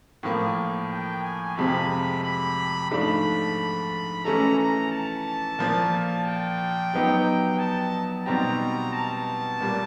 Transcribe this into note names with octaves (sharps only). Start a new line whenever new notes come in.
A2 F3 A#3
G5
G#5
F2 C3 F3 G#3 B5
B5
G#2 F3 A3 D4 B5
E3 A3 C#4 E4 A4 A#5
A#5
A5
A#2 F3 A#3
G5
F#3 B3 D#4 G4
A5
B2 G3 C4 D#4 G4 A#5
A5
A#2 G3 A#3